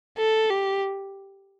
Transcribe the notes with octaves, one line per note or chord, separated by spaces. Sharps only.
A4
G4